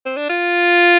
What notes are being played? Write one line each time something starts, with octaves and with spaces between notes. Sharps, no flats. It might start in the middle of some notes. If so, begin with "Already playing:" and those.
C4
D4
F4